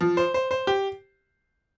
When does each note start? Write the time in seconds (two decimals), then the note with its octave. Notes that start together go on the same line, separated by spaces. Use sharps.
0.01 F3
0.17 C5
0.34 C5
0.51 C5
0.67 G4